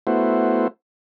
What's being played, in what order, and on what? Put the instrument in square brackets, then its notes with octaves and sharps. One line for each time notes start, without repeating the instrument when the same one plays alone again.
[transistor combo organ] A3 B3 E4 F#4 C5